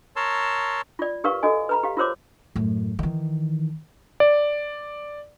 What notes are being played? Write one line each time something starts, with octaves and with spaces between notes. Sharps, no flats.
A#4 C#5 A5 C6 E6
F4 D5
G4 A#4 B4 F5 C#6
F#4 A4 D#5 G#5
B4 A#5 B5
G4 F5
F4 F#4 A#4 C5 C#5 D6
F#2 A2
D#3 E3
D5